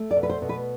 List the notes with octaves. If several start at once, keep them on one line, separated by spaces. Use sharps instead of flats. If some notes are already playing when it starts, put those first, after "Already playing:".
Already playing: A3
D5
B2
B4
C5
B2
B4